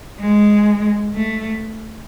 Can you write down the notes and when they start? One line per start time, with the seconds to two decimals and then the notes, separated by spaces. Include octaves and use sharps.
0.20 G#3
1.13 A3